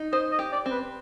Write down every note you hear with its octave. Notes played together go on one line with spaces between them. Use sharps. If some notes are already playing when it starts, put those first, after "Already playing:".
Already playing: D#4
C5 D#5
D#5
G4
D5
C4
B4